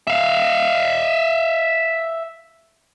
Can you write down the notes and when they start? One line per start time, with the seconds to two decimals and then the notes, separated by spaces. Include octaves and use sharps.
0.07 E5 F5